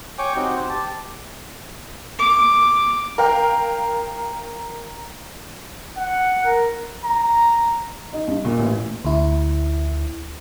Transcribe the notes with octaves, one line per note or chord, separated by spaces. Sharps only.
C#5 G5 G#5 C#6 D6
C4 D#4 F#4 G4
C5
G4 A5
D6
A#4 F5 G5
F#5
A#4
A#5
D#4
G2
A#2
A1
D2 E4